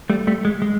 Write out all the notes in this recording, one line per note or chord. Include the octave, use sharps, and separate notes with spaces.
G3 A3
G3 A3
G#3
G#3